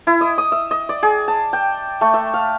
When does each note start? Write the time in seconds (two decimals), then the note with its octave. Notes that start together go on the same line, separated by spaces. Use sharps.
0.07 E4
0.21 D#5
0.38 D#6
0.52 E5
0.71 D#5
0.89 D5
1.03 G#4
1.28 A5
1.53 G5
2.01 A3
2.14 E5
2.34 F5